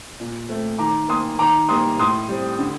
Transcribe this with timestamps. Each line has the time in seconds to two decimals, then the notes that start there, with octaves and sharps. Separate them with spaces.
0.20 A#2
0.48 A3 C4
0.78 D#3 A#5 D6
1.08 A#3 C6 D#6
1.39 D#3 A#5 D6
1.69 G3 A#3 C6 D#6
1.99 A2 C6 D#6
2.28 G3 C4
2.59 D3